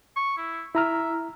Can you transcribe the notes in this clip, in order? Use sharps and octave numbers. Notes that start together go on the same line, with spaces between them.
C#6
E4
E4 E5 A#5 F6